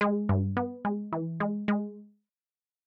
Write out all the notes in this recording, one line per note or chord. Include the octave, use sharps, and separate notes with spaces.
G#3
G2
B3
G#3
E3
G#3
G#3